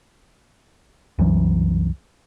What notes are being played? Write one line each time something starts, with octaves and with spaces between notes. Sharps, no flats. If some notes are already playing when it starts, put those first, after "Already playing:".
C2 F#2 E3 F#3